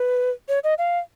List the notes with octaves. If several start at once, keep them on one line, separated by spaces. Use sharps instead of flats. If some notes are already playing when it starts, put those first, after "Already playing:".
Already playing: B4
C#5
D#5
F5